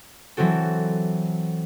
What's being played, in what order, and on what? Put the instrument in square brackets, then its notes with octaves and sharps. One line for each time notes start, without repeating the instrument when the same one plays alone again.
[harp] E3 F#3 C4 F#4 A4